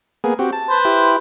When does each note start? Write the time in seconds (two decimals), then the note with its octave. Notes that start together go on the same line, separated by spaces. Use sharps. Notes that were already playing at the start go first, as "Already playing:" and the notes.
0.24 A#3 B3 G#4
0.39 C4 F#4 G4
0.53 A5
0.69 B4 C5
0.85 E4 G4